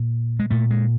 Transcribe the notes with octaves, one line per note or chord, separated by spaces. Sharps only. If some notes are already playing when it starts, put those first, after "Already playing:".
Already playing: A#2
G#3
A#2 A3
G#3